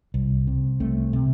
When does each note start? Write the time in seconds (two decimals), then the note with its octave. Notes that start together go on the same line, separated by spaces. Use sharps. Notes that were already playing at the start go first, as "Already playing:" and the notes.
0.14 C2
0.47 C3
0.80 C2 A3 C4
1.13 C3